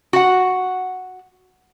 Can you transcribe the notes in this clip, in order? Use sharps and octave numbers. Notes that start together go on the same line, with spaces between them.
F#4 F#5